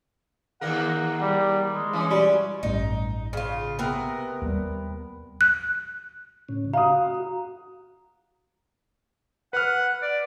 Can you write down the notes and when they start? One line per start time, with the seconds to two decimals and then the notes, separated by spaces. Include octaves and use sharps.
0.61 D#2 A#3 A#4 F#5
1.21 G3
1.74 G#3
1.93 E3 C#4
2.11 G3
2.63 A1 G2 D#4
3.33 C#3 F4
3.79 C3 B3 A#4
4.41 D#2 G3
5.41 F#6
6.49 A2 C#3 C#4
6.73 F#4 F5 A#5 D#6
9.53 B4 F#5 F6
10.02 D5